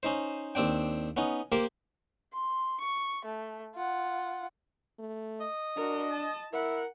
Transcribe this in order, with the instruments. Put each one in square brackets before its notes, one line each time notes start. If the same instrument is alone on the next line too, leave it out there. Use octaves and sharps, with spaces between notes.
[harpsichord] C#4 D#4 C5
D#2 C4 D4 G5
B3 C#4 D#4
A#3 G4 A#4 C5
[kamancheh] C6
C#6
A3
F4 F#5
[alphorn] A3
[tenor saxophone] D#5
[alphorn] D4 [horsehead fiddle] F#4 A#4
[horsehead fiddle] A5
[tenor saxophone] E4 [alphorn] A#4 [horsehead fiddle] F#5